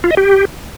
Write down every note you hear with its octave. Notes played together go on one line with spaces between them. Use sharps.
F4
D#5
G4